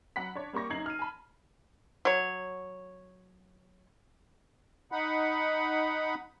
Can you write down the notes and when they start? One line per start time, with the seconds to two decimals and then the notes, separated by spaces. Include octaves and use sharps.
0.16 F#3 F#5 B5 B6
0.35 D4 C#5
0.53 G3 A#3 G4 C#6 A#6
0.70 F#2 D#4 G#6 C7 F#7
0.86 F6 D#7
0.99 G#5 A5 B5
2.05 F#3 C#5
4.92 D#4 F#5 B5